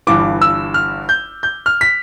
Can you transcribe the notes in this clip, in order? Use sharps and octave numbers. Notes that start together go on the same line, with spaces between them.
G1 G2 E3 D6
E6
F6
G6
G6
F6
B6